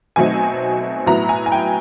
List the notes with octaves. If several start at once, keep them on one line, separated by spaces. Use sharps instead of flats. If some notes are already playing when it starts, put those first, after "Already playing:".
B2 F#3 A3 C4 D#4 G#5
A2 F#3 B3 E4 A#5
G#5
G#5
G5